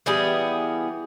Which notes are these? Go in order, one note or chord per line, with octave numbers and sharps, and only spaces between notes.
E3 G3 B3 G#4